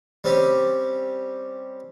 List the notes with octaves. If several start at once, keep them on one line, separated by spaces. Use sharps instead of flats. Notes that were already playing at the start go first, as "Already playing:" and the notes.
G3 C4 C#4 G4